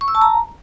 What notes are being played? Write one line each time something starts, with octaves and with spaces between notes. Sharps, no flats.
C#6
E6
A5
A#5